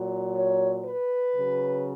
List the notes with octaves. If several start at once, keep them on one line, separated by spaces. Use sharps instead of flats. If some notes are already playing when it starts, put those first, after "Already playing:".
Already playing: A#2 F#3
C#5
B4
C#3 F#3